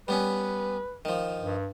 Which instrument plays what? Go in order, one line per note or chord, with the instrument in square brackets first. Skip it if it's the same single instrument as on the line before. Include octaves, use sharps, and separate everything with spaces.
[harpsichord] G3 B3 C#4 [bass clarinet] B4
[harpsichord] D#3 F3
[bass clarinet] G2